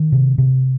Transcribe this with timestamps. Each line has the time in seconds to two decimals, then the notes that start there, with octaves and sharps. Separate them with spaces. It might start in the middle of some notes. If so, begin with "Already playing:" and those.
Already playing: D#3
0.12 C3
0.38 C3